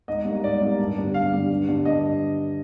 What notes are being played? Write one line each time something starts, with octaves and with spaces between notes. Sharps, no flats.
G#2 D#5
G3 A#3
G#2 D5
G3 A#3
G2
D3 G3 D4
G2 F5
D3 G3 D4
G2
D3 G3
G2 D#5